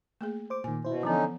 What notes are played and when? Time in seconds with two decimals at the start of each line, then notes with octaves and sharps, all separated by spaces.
0.21 A3 A#3 G#4
0.50 C5 D6
0.64 A#2 D#3 G#5
0.85 B2 E4 C5
1.03 D3 E3 F3 B3 C#4 D#4